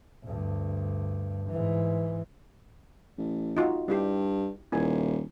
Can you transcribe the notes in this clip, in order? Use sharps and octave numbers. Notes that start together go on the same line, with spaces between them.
D2 G2
G#2 E3
A1
D#4 F4 F#4
G2 D4 E4 G4
D#1 E4 G#5